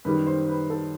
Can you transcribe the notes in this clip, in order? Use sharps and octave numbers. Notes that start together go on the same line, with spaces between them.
F#2 D#3 G3 B4
C5
B4
A4